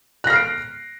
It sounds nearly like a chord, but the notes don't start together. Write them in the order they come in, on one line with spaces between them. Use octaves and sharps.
F#6 A#6 F6 C7 D7